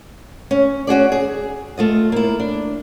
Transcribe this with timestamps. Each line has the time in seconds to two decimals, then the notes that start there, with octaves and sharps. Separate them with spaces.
0.51 C#4
0.87 C#4 F#4 G#4 D5
1.12 G#4
1.78 A3 F4 D#5
2.12 A#3 E4
2.40 D4